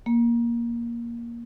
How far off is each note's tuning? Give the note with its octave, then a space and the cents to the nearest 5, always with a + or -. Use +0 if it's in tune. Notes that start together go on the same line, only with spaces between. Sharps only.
A#3 +10